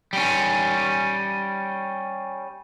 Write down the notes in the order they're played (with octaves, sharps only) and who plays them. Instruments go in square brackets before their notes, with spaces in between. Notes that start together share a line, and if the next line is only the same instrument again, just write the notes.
[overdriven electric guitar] G3 C#4